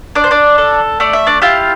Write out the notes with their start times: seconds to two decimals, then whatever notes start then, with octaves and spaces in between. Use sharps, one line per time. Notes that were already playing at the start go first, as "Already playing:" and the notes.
0.15 D4 D5
0.24 C5
0.31 D4 D5
0.58 A4
1.00 A3 D5
1.13 E5
1.27 D4 D5
1.41 E4 F4 G4 F5